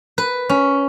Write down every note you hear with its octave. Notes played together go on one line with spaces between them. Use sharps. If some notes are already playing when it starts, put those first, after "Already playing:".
B4
C#4